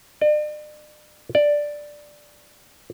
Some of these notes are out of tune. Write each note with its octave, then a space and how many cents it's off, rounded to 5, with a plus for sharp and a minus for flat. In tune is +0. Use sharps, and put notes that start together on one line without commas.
D5 +45
D5 +5